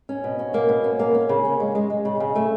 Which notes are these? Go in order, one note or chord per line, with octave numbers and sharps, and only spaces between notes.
C#4
B2
C#4
A#3
B2
C#4
A#3
C#4
C#3
C#4
G#3
G#3
G#3
C#3
C#3
A3